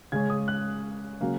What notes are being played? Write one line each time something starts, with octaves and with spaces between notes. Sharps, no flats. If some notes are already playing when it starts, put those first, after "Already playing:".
C#3 G#3 C#4 G#6
D#6
F#6
C#3 F#3 A#3 C#4